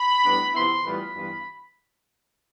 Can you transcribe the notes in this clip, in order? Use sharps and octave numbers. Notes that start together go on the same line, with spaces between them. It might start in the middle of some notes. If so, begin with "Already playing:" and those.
Already playing: B5
A2 G3 B3 D4
C3 F3 B3 E4 C6
A2 E3 G3 B3 F4 B5
G2 E3 B3 F4